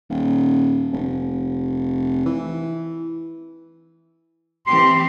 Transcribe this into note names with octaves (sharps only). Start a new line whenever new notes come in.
D#1
F1
E3
E3 C4 G4 C6